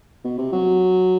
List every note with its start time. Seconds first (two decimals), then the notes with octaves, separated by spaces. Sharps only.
0.24 B2
0.38 C3
0.52 F#3